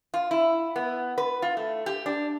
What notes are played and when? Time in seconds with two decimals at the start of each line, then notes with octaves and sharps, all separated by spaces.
0.14 F4
0.31 E4
0.76 B3
1.18 B4
1.42 F4
1.57 A3
1.86 G4
2.06 D4